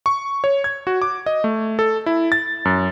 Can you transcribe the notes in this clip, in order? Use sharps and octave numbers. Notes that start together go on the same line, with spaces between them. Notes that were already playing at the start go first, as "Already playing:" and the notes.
C#6
C#5
G#6
F#4
D6
D#5
A3
A4
E4
A6
F#2